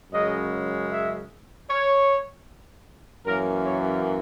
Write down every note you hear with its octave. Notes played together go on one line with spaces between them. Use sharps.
F#2 C#3 G#3 D#5
E5
C#5
F#2 E3 A#3 C#4 A#4
C#5